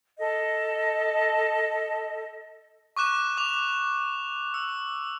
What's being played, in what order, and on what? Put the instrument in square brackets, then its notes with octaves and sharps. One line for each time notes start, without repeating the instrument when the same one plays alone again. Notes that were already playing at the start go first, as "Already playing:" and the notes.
[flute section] A4 D#5
[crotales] C#6 D6 F#6 E7
D6 F7
E6